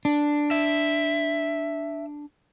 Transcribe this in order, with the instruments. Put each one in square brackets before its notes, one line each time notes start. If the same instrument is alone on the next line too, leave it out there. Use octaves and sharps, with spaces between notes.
[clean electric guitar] D4
[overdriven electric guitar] E5